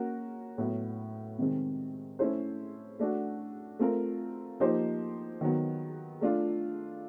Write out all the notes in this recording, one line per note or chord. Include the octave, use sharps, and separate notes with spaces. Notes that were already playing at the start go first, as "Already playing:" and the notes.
Already playing: A#3 C#4 F#4 A#4
A2 F#3 B3
C3 D#3 G#3 C4
A3 C#4 E4 A4 C5
A3 D4 F#4
A3 C4 F4 A#4
F3 A#3 D#4 G4 C5
D#3 F#3 B3
A3 D4 F4